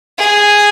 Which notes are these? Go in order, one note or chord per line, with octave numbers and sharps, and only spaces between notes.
G#4